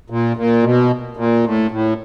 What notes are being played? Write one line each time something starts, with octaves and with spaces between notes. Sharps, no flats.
A#2
A#2
B2
A#2
A2
A2